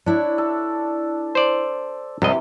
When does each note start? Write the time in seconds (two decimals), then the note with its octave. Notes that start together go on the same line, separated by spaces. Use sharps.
0.06 D4 E4 C#5
0.38 A4
1.35 C5 D5
2.22 C2 C3 E3 G4 D#5